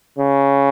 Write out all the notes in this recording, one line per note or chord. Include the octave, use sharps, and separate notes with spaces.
C#3